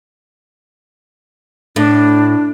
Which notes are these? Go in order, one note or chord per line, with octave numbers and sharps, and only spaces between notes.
A2 D4